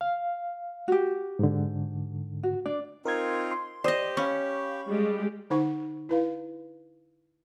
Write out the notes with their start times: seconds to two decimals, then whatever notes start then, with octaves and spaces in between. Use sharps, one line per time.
0.01 F5
0.88 F#4 G4
1.39 G#2 D3
2.43 F#4
2.66 D4 D5
3.05 C4 D#4 F4 A#4 C6 G#6
3.51 C6
3.84 G4 C5 D5 D#5 D#6
4.17 C#4 F5 B5 C#6
4.86 G3 G#3 G4
5.50 D3 D#4 C5 F#5 C#6
6.09 E4 B4 F5